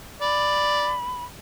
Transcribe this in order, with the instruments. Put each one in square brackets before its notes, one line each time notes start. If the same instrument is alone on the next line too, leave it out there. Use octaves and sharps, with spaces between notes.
[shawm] D5 [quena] B5